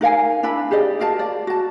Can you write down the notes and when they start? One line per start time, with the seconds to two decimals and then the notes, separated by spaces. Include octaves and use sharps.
0.01 D#4 A#4 F5 G#5
0.43 D4 E4 B4 B5
0.71 G4 G#4 D5 D#5
1.00 F#4 A#4 F5 A5
1.19 D5
1.47 F#4 A5